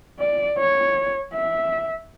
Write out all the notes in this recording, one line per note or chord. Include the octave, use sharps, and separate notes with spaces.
D5
C#5
E5